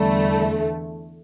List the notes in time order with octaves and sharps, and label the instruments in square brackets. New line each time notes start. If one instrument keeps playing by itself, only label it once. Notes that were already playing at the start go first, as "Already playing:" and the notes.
Already playing: [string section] E2 D3 A3 [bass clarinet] G3